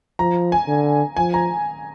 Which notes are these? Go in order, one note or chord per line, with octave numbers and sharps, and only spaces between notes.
F3 A#5
G#5
D3
F3 G#5
A#5